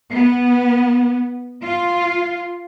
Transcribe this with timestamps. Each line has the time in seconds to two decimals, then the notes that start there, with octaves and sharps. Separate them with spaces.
0.12 B3
1.63 F4